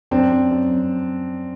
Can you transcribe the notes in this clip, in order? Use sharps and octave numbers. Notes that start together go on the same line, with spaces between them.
F#2 C4 D4
F#2
F#2
F#2